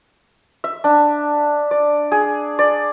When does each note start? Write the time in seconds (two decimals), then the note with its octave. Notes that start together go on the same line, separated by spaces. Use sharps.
0.64 E5
0.84 D4
1.71 D5
2.12 G#4
2.59 D5